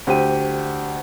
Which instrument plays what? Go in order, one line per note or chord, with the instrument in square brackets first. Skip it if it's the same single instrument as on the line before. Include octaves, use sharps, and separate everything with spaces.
[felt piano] D2 G4 C5 G5 D#7